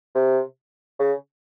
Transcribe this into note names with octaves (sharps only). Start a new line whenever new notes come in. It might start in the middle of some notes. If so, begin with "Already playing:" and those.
C3
C#3